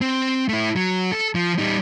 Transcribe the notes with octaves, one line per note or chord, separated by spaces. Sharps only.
C4
A3 E4
F#3
A4
F3
G3 D#4